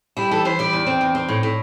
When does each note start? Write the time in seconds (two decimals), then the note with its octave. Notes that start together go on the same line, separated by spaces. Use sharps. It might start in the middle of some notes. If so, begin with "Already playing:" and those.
0.17 G3 E4
0.31 E3 A4
0.45 E3 C5
0.59 G3 D5
0.73 E2
0.86 C4
1.01 E2
1.15 C4
1.28 A2
1.43 A2